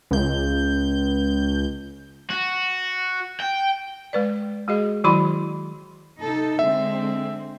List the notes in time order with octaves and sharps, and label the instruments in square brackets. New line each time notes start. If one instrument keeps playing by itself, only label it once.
[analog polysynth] C#2 G6
[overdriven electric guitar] F#4
G5
[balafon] G#3 B4 D5
G#3 F#4 G#4 D#5
D#3 F#3 E4 F#4 B5 C6
[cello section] C3 D#4 A4
[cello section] D3 G#3 C4 [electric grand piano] E5